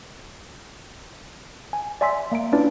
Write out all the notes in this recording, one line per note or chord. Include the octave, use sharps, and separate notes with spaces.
G#5
D5 E5 G#5 C6 E6 B6
A#3 E5 A#5 D7
C#4 D4 E4 F4 B4 D5